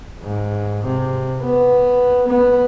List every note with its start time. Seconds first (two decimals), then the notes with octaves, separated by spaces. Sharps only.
0.23 G#2
0.86 C3
1.43 B3
2.28 B3